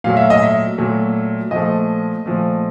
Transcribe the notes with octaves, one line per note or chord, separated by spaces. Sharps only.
A#2 F#3 A3 F5
E5
D#5
E5
A#2 F#3 A3
A#2 F3 A3 D#5
A#2 F3 A3